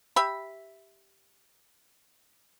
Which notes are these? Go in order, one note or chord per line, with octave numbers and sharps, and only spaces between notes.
G4 E5 B5